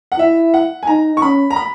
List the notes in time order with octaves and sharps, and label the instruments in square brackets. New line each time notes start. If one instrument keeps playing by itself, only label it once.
[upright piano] F#5
[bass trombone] E4 [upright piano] E5
[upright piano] F#5
G#5
[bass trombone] D#4 [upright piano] A#5
[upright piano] C#6
[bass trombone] C#4 [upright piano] B5
[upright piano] A#5
B5